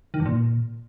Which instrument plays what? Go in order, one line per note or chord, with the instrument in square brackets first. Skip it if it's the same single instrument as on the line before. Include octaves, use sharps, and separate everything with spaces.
[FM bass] D#3
G2
A#2